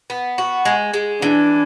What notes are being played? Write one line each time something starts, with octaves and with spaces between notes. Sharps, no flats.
B3
F#4
G#3
G#3
E3 D4